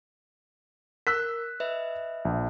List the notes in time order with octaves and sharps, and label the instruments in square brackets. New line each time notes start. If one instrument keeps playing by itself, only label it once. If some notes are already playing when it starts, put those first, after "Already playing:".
[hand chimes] A#4 [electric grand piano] E6 F#6 B6
[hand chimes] B4 D#5 E5
[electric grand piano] A#1